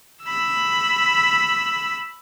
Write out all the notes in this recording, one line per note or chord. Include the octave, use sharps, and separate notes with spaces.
B5 E6